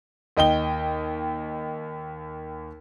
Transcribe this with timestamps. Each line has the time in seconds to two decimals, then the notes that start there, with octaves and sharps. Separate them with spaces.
0.37 D#2 D#5 G5 G7